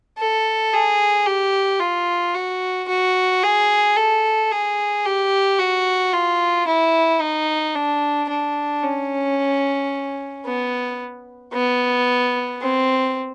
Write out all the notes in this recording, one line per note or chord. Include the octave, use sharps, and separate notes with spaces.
A4
G#4
G4
F4
F#4
F#4
G#4
A4
G#4
G4
F#4
F4
E4
D#4
D4
D4
C#4
B3
B3
C4